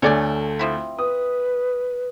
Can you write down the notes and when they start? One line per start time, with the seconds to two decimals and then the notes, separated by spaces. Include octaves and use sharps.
0.02 D2 A3 C#5 D5 G#5
0.59 F3 C4 E4
0.99 B4 D#6